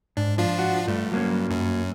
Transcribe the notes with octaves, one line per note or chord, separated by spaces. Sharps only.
G#2 D4
F3 D4 F4
F#4
G2 A3
F#3 A#3 C#4
F#2